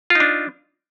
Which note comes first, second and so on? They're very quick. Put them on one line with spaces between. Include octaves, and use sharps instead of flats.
F4 D#4 D4